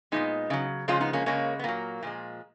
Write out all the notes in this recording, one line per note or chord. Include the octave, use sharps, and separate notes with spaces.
A#2 F3 G#3 B3 D#4
C#3 F#3
C#3 F3 G#3 C#4 F4
B3 D#4
A#3 C#4
C#3 G#3 A#3 C#4
B3
A#2 F#3 A#3
A#2 F3 G#3